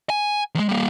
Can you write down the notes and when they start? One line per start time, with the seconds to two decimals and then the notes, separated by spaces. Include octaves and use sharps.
0.10 G#5
0.55 E2 G#3
0.69 G3 A#3